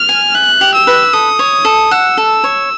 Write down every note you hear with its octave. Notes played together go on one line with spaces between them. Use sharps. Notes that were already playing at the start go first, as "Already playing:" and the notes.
Already playing: F6
G#5
E5 F#6
G4
E6
B4
A4 D#6
C#5
A4
F#5 E6
A4
C#5